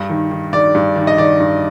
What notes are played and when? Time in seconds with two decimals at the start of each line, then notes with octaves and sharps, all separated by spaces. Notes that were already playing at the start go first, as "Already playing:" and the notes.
Already playing: G2
0.10 D#3
0.31 D#3
0.53 D#3 D5
0.75 G2
0.96 D#3
1.07 D#5
1.18 D#3 D5
1.40 G2